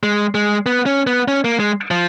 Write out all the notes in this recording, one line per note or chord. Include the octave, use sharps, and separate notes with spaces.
G#3
G#3
B3
C#4
B3
C#4
A#3
G#3
F3